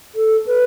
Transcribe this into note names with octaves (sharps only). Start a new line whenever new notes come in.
A4
B4